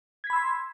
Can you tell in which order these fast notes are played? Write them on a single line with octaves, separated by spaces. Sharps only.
G#6 B6 B5 E6 C6